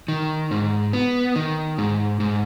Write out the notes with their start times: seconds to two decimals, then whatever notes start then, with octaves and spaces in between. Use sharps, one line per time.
0.08 D#3
0.51 G#2
0.93 B3
1.36 D#3
1.78 G#2
2.20 G#2